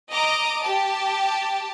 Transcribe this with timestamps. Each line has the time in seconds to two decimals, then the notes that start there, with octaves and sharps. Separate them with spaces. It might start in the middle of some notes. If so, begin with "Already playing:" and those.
0.11 D#5 A#5 D6
0.62 G4 A5